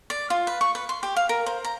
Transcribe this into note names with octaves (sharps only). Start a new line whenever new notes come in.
D5
F4
B4
C#6
B4
C6
G4
F5
A#4
C5
A#5